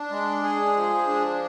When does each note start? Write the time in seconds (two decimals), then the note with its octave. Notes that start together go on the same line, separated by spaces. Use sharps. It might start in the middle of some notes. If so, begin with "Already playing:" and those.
Already playing: D4
0.10 G#3
0.43 G#4
0.75 F3
1.07 D4